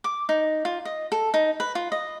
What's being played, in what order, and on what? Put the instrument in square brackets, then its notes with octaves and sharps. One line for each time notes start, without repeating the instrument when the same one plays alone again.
[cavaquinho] D6
D#4
F4
D#5
A4
D#4
B4
F4
D#5